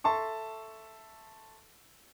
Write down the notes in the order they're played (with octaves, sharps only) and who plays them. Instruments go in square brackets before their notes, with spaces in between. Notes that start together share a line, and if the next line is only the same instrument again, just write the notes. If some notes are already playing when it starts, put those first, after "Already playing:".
[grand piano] A4 E5 A5 C6 C#6